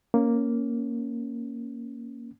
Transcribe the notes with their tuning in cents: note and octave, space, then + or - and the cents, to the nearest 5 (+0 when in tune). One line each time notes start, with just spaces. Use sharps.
A#3 +0 C#4 +0